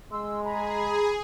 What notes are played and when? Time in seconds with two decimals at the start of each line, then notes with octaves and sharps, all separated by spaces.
0.11 G#3 C6 E6
0.44 G#4 A#5 B5